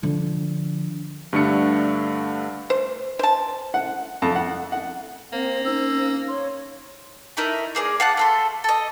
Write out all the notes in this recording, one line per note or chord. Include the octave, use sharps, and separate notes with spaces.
D3 F3
G2 D3 A3 D4 C#7
C5
C5 A5
F#5
F2
F#5
F#5
A#3 C4 C5
C#4 D#4 C5 E6
C#5 C6
A3 D#4 E4 A#4
A#3 G#4 C#5 D5
F5 F#5 A5 F#6
A3 A4 C6
A4 D#5